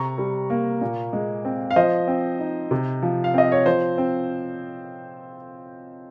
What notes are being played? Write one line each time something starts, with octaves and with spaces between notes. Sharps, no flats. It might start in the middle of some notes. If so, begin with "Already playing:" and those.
Already playing: C3 A#5 C#6
G3
A#3
A#2
G#3
C4
F5
F3 C5 D#5
C4
D#4
C3
F3
F5
C4 D#5
C#5
F3 C5
C4